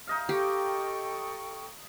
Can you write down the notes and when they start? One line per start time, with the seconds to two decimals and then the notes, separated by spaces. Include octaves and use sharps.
0.07 D#4 D#5 F5
0.29 G4 A4 G5 C#6